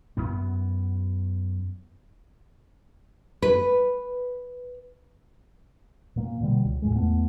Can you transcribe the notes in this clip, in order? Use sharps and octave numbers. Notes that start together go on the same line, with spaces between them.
F#2 B3
B4
A#2 A#3
B2 D3 G3
C#2
F2 A2 G#3
E2 A3 B3